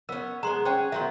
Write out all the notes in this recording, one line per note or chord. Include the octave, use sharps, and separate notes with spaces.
B3 C#4 A#4
G#3 B3 A#5 C6
C#4 G#4 C5 F#5 G5
D#3 F#3 B3 E5 C6